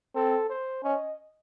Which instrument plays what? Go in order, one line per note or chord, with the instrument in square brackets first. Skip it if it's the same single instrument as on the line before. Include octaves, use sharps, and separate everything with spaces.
[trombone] C4 [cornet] A4
[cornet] C5
[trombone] C#4 [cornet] D#5